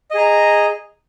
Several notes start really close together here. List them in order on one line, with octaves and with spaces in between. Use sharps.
D#5 G#4 A#5